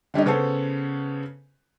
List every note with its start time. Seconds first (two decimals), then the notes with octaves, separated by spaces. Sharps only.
0.14 D3 G3 C#4 D#4
0.26 C#3 B3 C#4 A4 C5